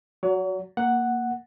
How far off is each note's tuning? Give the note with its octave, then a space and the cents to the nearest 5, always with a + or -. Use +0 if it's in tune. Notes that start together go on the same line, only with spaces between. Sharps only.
F#3 +0 C#5 +40
A#3 +0 F#5 +0